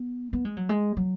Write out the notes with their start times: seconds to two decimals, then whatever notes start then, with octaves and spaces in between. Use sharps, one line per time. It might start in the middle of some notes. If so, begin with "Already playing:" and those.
Already playing: B3
0.33 B3
0.45 G#3
0.57 F#3
0.69 G#3
0.97 F#3